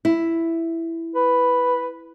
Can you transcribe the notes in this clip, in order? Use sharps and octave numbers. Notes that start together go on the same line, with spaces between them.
E4
B4